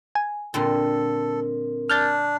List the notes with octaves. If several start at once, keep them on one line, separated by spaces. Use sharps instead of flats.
G#5
A#2 D3 G3 C4 A4 A#4
D4 F6 G6 A6